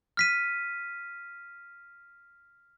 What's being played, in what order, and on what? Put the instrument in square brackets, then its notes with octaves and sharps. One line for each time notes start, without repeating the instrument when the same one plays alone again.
[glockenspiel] F6 B6 D#7